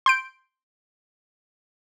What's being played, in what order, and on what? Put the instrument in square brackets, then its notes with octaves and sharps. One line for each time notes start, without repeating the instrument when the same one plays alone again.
[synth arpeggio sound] C6 G6 D7